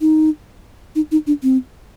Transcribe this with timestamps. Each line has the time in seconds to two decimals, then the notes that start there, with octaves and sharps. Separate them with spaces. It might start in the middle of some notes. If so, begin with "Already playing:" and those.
0.01 D#4
0.95 D#4
1.12 D#4
1.27 D4
1.43 C4